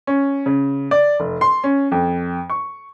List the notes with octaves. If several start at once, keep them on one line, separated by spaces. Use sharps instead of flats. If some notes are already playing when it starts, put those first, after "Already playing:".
C#4
C#3
D5
F1
C6
C#4
F2
C#6